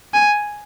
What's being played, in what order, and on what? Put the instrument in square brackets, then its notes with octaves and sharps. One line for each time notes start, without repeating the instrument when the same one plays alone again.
[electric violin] G#5